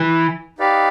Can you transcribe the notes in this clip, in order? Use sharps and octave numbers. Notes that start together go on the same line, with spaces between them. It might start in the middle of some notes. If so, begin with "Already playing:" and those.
Already playing: E3
D#4 G4 B4 D5 F5